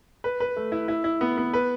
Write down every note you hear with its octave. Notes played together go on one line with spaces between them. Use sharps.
B4
B4
A3
E4
E4
E4
B3
B3
B4